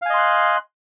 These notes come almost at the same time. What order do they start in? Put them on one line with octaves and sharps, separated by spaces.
F5 G#5 D#5 C6 F#6